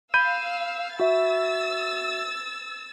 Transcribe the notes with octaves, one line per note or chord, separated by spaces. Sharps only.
F5 B5 E6 G6 D#7
F#4 E5 E6 A6